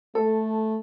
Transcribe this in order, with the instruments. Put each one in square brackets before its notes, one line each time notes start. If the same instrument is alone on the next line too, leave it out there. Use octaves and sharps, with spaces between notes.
[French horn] A3 [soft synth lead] A4